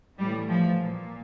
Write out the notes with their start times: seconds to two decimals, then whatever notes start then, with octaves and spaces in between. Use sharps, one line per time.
0.19 A2 E3 G3
0.49 F3
0.80 A#2